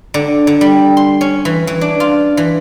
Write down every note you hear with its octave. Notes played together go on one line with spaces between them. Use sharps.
D3
D3
G3
C6
C#4
E3
E3
D4
F4
E3